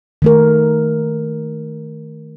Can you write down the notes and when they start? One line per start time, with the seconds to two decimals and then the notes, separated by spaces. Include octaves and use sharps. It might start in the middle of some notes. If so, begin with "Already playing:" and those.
0.22 D#3 A3 A#4